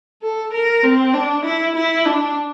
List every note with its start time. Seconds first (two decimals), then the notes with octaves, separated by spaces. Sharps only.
0.22 A4
0.53 A#4
0.83 C4
1.14 D4
1.45 E4
1.75 E4
2.05 D4